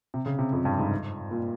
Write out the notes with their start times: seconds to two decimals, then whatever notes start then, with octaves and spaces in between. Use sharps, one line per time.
0.14 C3
0.26 C#3
0.39 C3
0.53 F2
0.65 G2
0.79 G#2
1.31 A#2